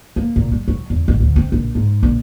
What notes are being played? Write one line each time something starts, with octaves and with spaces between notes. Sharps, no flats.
A#3
A#2
G3
F#3
E2
A1
D2
C4
A#1
G#2
A#1